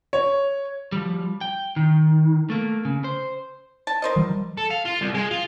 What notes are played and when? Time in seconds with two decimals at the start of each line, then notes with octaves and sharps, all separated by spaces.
0.13 C#5
0.92 F3 G3
1.41 G5
1.76 D#3
2.50 A3 A#3
2.85 C#3
3.04 C5
3.87 A5
4.02 A#4 C5 D#5
4.16 E3 F#3 G3
4.58 A4
4.70 F5
4.85 F4
5.01 C2
5.14 G#3
5.31 F4